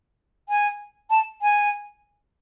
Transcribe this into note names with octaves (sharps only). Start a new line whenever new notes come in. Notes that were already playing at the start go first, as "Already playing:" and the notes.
G#5
A5
G#5